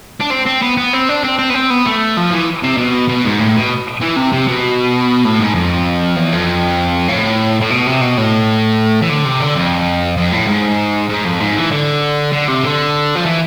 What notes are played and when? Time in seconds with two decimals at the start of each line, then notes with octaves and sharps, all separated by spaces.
0.21 D4
0.31 C4
0.46 C4
0.62 B3
0.77 B3
0.93 C4
1.09 D4
1.24 C4
1.38 C4
1.50 B3
1.54 C4
1.70 B3
1.86 A3
2.17 F3
2.31 E3
2.63 C3
2.77 B2
3.08 B2
3.25 G#2
3.39 A2
3.55 B2
4.01 E3
4.16 C3
4.32 C3
4.47 B2
5.24 A2
5.40 G#2
5.55 F2
6.16 E2
6.33 F2
7.08 A2
7.61 A2
7.70 B2
7.86 C3
8.01 B2
8.17 A2
9.02 E3
9.09 D3
9.25 C3
9.40 D3
9.55 F2
10.17 F2
10.32 A2
10.48 G#2
11.09 G#2
11.25 F2
11.40 G#2
11.56 E3
11.71 D3
12.33 D3
12.48 C3
12.64 D3
13.15 F3
13.26 E3